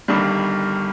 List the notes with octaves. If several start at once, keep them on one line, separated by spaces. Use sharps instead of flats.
G1 G2 D#3 G3